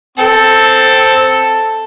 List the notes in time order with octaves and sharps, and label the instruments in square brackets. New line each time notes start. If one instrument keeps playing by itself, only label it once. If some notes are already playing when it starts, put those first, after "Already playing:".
[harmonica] C4 [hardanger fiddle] A4